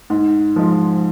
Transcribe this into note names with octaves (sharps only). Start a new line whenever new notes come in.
G#2
F3 G#3